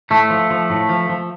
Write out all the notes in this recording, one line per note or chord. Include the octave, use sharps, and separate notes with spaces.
A2 A3
F3
F3
A2
F3
F3